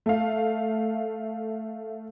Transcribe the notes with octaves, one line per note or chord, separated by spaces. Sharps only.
A3 F5